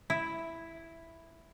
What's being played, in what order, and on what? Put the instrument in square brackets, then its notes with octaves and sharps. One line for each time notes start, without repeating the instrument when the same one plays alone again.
[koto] E4